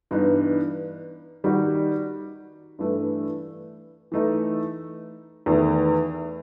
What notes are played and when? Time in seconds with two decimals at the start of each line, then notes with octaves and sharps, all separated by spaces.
0.11 G2 E3 B3 D#4
1.44 D#3 G3 D#4 F#4
2.79 G2 E3 A3
4.12 E3 A3 D#4
5.46 E2 D#3 A3